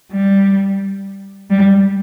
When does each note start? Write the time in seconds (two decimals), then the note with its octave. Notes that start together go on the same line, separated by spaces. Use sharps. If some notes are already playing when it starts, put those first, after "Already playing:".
0.13 G3
1.50 G3